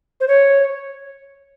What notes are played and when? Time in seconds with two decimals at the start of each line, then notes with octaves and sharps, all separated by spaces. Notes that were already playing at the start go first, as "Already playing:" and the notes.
0.21 C5
0.28 C#5